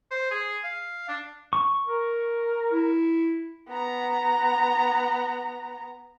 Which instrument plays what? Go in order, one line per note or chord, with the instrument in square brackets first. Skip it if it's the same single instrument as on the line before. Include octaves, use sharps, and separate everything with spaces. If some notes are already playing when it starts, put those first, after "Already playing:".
[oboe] C5
G#4
F5
D4
[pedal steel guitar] C#6
[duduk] A#4
[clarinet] E4
[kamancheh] B3 A#5